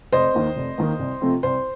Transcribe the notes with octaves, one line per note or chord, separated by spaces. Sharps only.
F1 C5 D#5
D#2 D#3 A#3
F1
D#2 D#3 A#3
C2
C3 F3 A3 C4
C2 C5